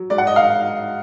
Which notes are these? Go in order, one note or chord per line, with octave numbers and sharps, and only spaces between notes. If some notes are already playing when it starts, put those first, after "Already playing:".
Already playing: F#3
G#2 D5
F#5
D#5
F5